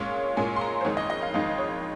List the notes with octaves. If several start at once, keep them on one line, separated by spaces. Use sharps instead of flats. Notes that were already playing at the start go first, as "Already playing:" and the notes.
Already playing: A#2 G#3 C#4 F4 C#5
A#2 G#3 C#4 F4 G#5
C6
A#5
C5
F2 D#3 G#3 D#4 C#5
D#5
D#5
F5
F2 D#3 G#3 D#4 F5
C#5